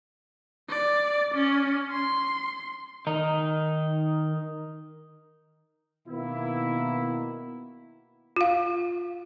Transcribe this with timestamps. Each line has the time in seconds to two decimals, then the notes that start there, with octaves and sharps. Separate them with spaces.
0.70 D5
1.35 C#4
1.91 C6
3.07 D#3 D#4
6.07 B2 D#3 A#3 B3 E4
8.36 F4 F5